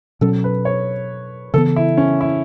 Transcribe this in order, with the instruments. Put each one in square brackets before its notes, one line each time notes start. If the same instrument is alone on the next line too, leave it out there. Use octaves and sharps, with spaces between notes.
[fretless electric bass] B2 F#3 C#4 [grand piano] A4
[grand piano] B4
C#5
[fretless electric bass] C#3 E3 B3 [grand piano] A4
[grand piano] E4
C#4
E4